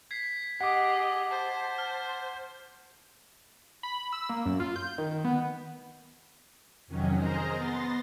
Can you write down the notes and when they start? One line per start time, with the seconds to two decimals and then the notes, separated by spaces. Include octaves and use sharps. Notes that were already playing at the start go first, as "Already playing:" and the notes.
0.11 G#6 B6 C7
0.61 G4 G#4 D#5 F#5 D6 B6
1.31 C5 A5
1.78 F6
3.83 B5
4.13 E6
4.29 A#3
4.45 F#2
4.60 F4
4.76 G6
4.98 D#3
5.24 B3
6.87 F2 C3 D#3 F#3 C#4
7.16 G#4 A#4 C5 D#5 A#5
7.52 B3 C6 A6 A#6